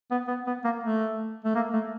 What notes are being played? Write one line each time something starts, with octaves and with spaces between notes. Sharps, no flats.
B3
B3
B3
A#3
A3
A3
A#3
A3